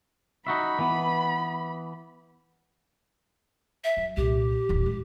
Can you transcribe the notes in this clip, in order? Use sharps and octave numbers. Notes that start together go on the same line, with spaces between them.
D#4 F#4 E5 B5
E3 B3
E5
F#2
C2 A#2 G4
D#1 A1
G#3